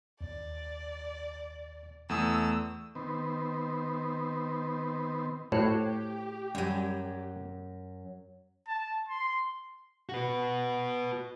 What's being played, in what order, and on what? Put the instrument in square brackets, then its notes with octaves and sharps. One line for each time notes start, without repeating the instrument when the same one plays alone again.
[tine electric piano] D#2 [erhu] D5
[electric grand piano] E2 A3 D#6 [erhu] E6
[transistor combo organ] D#3 B3 C4
[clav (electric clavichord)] A2 [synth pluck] F#4 C5 C#5 [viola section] G4
[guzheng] F#2 F#3 [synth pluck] G3
[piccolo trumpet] A5
C6
[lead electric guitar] F#4 B4